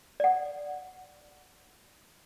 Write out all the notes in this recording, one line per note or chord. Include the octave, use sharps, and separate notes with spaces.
D5 F#5